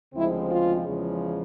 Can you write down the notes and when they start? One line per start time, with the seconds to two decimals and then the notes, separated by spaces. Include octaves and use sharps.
0.14 D2 C#3 F3 G#3 C4 E4
0.50 F4
0.85 E2 C#3 F3 G#3